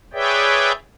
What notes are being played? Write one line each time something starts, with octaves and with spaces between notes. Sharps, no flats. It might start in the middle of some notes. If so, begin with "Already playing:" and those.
G#4 B4 C#5 D5 E5 G5